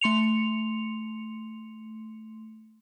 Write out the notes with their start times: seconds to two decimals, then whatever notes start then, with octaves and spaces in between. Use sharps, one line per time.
0.01 A3 C6 C#7 F7